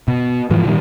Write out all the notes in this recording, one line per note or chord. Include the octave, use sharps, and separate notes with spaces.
B2
G#2 E3 F3
A#2 D#3 G3